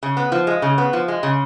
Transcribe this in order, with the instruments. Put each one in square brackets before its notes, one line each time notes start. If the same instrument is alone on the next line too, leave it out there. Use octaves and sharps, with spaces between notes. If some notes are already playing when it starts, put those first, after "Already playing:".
[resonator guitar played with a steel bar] C#3
B3
F3
G#3
C#3
B3
F3
G#3
C#3